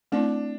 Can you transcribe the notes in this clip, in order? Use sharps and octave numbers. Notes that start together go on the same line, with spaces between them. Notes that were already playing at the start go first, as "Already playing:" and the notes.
A3 C4 D4 E4